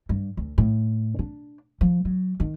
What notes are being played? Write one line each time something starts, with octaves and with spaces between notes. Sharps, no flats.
G2
D2
A2
D4
F3
F#3
D#3